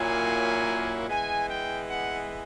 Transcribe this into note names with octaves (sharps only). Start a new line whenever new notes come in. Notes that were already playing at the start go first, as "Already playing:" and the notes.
Already playing: A#2 F#3 A#3 C#4 E4 G#5
E3 G#3 B3 G#5
G5
F#5